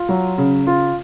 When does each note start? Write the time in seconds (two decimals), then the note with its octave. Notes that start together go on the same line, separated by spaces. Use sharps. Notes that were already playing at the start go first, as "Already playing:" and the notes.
Already playing: F4
0.09 F#3
0.38 C#3
0.67 F4